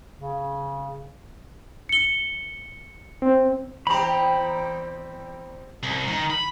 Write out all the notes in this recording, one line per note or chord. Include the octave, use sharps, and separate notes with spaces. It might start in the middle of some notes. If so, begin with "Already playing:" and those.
C#3
C#7 G7
C4
E2 C4 G4 A#5 B5
C2
D#3
B5